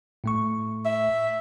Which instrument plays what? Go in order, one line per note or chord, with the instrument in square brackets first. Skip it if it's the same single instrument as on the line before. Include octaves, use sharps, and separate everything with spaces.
[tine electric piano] A2 A3 C#6
[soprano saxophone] E5